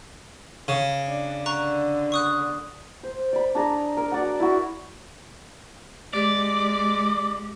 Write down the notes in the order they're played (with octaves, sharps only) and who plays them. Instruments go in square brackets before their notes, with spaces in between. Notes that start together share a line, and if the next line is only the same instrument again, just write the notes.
[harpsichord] C#3
[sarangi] D4
[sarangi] D3 [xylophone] A#5 C#6 F#6
[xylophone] C#6 D#6 F#6
[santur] C5
D5 B5
D4 G#4 A#5
A#4
F#4 D5 F#5
E4 F#4
[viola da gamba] G#3 [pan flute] G4 [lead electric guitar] D5